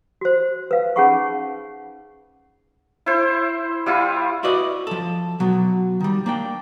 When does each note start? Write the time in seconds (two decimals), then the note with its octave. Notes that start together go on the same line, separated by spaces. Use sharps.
0.21 F#4 C5
0.71 B4 F5
0.96 C#4 D#4 G#4 F#5 B5 C#6
3.06 E4 C5
3.86 G3 E4 F4
4.43 E4 F#4 B4 D5 D#5
4.87 F3 A4
5.40 B2 F#3
6.00 D#3 G3
6.26 A#3 D4 G5